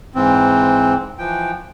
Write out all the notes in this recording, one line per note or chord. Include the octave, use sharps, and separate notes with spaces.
G#2 E3 C4
E3 F3 G5